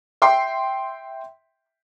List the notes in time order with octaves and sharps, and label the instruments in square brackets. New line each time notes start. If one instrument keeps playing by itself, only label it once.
[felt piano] E5 G5 C6